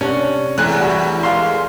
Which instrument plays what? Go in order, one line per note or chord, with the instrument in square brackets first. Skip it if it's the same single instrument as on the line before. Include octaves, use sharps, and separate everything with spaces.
[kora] C3 F#5 [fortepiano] C#4 [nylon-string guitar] D4
[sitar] E2 [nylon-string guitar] A3 [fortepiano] G#5 F#6
[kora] G3 C#5 [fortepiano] F#4
[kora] G#3 A#3 A4 [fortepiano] F5 C6